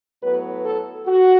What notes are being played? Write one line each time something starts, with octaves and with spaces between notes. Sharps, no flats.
A2 F#3 B3 B4
A4
F#4